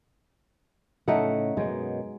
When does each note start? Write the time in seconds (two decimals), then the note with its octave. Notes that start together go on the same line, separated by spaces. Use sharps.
1.08 A2 C#3 A3 D#4 F#5
1.57 F#2 B2 G#3